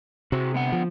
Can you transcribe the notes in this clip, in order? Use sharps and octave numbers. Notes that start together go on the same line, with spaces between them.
C3 F#4 G#4
D3 B3 F#5
F3